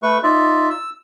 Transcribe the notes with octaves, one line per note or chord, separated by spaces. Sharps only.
A3 B4 C#6
D#4 F4 D5 E5
E6